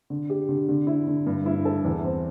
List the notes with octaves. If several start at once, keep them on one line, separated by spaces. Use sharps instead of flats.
D3
G4
D3
D3
E4
D3
G2
E4
A4
E2
C4